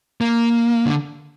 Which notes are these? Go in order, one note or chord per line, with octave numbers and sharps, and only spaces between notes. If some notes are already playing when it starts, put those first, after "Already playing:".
A#3
D3